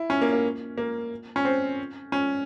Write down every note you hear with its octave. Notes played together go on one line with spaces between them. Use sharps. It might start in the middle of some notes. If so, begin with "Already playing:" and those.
Already playing: E4
C#4
A#3
A#3
A#3
C#4
C4
C#4